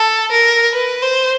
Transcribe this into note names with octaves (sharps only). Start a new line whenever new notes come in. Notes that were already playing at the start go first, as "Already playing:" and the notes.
Already playing: A4
A#4
B4
C5